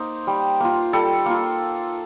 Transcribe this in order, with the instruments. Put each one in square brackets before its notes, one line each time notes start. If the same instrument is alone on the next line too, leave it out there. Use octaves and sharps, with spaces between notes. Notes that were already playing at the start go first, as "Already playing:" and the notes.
Already playing: [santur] A#3 D#4 C5
G3
A#3 F4
G3 A4
A#3 F4